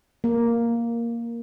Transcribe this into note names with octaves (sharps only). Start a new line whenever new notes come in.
A#3